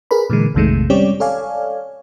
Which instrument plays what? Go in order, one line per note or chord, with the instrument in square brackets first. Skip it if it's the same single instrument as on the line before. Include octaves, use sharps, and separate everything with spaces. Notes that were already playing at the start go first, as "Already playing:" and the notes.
[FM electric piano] G#4 A#4 B4 B5
A#2 D3 E3 G#3
A#1 F2 C3 D#3 G#3 A3
G3 C4 C#4 G4 C#5 D5
A4 C#5 D5 F5 G#5